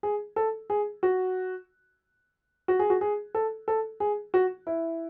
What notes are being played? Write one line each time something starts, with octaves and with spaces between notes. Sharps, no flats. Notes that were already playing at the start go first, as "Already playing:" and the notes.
G#4
A4
G#4
F#4
F#4
G#4
F#4
G#4
A4
A4
G#4
F#4
E4